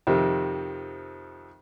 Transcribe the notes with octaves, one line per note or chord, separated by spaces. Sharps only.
F2 C3 D#3